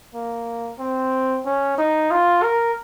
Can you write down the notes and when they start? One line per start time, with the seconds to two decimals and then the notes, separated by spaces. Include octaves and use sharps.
0.15 A#3
0.79 C4
1.46 C#4
1.78 D#4
2.11 F4
2.43 A#4